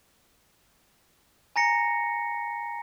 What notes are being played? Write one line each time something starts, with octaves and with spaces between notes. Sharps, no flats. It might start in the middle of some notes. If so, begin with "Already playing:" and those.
G#5 A#5 A#6 C#7